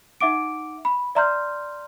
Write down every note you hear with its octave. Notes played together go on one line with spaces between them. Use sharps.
D#4 E5 F#5 D6 D7
B5
D5 E5 A#5 C6 F6 G6